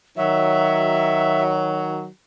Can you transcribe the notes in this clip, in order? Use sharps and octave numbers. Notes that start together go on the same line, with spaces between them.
D#3 F#3 E5